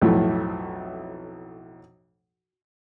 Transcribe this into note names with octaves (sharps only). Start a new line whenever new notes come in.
B1 F2 A2 A3